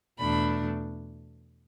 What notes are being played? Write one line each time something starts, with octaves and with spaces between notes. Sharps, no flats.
E2 B2 A3 D4 B5